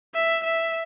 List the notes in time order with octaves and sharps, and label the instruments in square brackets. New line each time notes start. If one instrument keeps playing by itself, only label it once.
[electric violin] E5
E5